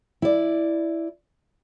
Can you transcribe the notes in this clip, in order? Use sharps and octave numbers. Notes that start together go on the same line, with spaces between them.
E4 D5